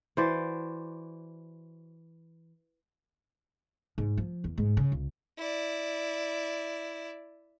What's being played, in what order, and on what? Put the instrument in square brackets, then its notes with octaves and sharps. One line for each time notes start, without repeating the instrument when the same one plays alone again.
[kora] E3 F#4 C5 D5
[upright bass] G#2
F3
E2
G#2
C#3
C#2
[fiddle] E4 D5